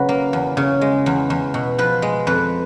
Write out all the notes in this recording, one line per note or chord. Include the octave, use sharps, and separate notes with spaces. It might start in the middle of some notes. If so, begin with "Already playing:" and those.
Already playing: C#3 F#3 B4
A#3
E2
C#3
G#3
E2
E2
B2
F3 B4
G#3
F2 B4